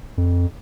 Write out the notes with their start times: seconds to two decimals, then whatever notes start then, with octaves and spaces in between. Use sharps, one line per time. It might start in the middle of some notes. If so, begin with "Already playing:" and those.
0.18 F2